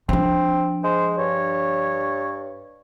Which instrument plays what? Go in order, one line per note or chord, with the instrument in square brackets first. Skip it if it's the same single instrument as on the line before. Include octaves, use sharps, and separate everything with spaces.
[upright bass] F3 D4 [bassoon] C4
[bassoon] G#3 [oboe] C5
[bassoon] G2 [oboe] C#5